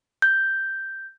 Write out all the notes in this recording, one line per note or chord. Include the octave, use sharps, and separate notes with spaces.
G6